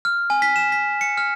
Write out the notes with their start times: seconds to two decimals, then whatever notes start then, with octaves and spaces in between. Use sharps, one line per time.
0.05 F6
0.30 G#5
0.42 B6
0.56 E7
0.72 B6
1.01 C#7
1.17 F6